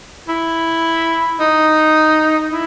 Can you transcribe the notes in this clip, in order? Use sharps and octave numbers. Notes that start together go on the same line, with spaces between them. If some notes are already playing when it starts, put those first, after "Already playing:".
E4
D#4
E4